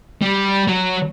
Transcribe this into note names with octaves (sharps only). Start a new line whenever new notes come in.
G3
F#3